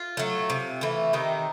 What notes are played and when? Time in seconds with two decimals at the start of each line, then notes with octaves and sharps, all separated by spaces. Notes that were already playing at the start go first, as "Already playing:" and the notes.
Already playing: F4
0.17 F#3 A3
0.50 C3
0.81 E3 A3
1.13 C3 D#3 D#4